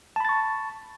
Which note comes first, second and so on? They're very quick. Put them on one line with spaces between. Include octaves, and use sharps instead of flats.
A5 B5 A6 C#6